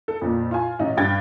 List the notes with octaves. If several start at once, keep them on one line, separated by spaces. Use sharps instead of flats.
A4
F2 A#2
F4 G#5
A1 D#4
G2 G5 G#6 A6